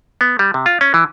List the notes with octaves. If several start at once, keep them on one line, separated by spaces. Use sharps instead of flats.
B3
G3
C3
F4
C#4
E3